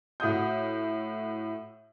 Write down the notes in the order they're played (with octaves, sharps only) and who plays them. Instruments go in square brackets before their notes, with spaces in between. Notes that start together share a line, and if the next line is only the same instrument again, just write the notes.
[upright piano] A2 F#4 D#6 G6